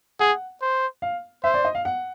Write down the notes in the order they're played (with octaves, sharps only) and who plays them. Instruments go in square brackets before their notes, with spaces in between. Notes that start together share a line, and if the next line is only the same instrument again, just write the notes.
[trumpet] G#4 [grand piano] F#5
[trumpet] C5
[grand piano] F5
[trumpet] C5 [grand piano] E5
[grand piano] D5
D#5
F5
F#5